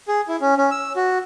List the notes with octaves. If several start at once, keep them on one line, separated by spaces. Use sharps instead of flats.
G#4
E4
C#4
C#4
E6
F#4